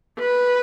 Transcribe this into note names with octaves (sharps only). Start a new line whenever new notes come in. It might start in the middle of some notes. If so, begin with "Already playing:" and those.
B4